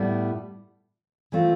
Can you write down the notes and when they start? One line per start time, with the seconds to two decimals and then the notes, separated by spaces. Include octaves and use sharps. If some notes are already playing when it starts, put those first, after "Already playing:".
Already playing: A2 G3 B3 E4
1.32 E3 A3 C4 F4